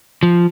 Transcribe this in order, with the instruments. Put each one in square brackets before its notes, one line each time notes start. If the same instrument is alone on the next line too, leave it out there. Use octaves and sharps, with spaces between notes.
[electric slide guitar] F3